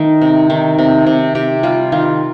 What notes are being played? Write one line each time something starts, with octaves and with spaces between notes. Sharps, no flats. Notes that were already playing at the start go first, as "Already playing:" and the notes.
Already playing: D#3 A3 D#4
C3
D#3
C3
C3
C3 G4
G3 F4
D#3 F4